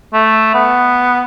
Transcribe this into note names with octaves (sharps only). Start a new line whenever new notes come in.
A3
B3